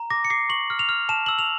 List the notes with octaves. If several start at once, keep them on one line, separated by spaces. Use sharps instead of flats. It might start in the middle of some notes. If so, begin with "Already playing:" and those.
Already playing: A#5
D6 A#6
C#7
D6 C7
C#6 F#7
F6
F7
F6
A5 E7
E6 F#7
F7